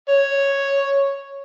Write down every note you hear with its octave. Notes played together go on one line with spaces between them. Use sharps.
C#5